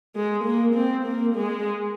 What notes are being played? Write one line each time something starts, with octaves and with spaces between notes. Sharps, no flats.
G#3
A#3
C4
A#3
G#3